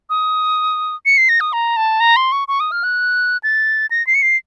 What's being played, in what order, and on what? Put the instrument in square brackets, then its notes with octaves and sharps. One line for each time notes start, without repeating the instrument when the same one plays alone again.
[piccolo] D#6
C#7
C7
A#6
D#6
A#5
A5
A#5
C6
C#6
C#6
D#6
F6
F#6
A6
A#6
C7
C#7
C7